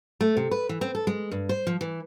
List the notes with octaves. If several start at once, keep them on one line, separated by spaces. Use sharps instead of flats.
A3
C3
B4
E3
C4
A4
G#3
G2
C5
F3
E3